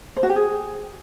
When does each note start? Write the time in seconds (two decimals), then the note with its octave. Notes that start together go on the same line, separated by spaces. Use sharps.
0.17 C5
0.23 F#4
0.30 G4
0.36 G#4